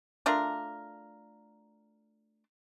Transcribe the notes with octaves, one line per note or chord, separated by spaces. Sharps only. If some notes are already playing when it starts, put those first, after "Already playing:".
A3 D4 F4 A#4